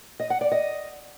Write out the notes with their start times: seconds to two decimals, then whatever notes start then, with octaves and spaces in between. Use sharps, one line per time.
0.20 D#5
0.30 F#5
0.41 D5
0.52 D#5